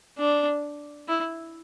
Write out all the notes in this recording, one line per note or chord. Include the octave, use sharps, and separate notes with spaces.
D4
E4